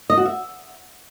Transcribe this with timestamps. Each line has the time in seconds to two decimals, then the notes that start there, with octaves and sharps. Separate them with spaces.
0.10 D#5
0.18 F#4
0.25 E5